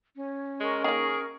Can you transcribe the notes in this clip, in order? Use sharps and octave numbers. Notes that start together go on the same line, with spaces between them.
C#4
G#3 A#4 C#6
D#3 A#3 G#4